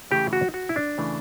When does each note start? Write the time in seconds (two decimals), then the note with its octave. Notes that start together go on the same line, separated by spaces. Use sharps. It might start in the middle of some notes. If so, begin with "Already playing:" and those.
0.11 C#3 E3 A3 G4
0.33 F#4
0.54 F#4
0.69 E4
0.76 D4
0.98 C#3 E3 A3